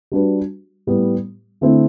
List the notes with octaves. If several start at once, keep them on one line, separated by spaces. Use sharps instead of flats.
G3 D4 F#4 B4
A2 G3 B3
D3 A3 C4 E4